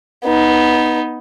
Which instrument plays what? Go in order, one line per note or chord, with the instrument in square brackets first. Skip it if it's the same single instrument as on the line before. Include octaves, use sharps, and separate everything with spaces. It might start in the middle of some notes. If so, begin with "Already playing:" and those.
[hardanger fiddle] B3 D#4